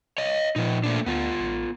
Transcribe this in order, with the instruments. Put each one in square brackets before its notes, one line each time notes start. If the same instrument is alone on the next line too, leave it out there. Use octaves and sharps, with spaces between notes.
[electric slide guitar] C#5 D#5
[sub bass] A#2 [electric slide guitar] F3 D#4
[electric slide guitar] A3 A#3 D4
[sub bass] D2 [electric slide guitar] B3 F4
[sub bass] A1